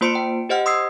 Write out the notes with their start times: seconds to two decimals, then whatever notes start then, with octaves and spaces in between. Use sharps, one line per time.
0.01 A#3 F4 C5 C6 C#7 D7
0.15 G5
0.49 G4 C5 D#5 F#5 F6
0.66 C6 D#6 E6 G#6 C7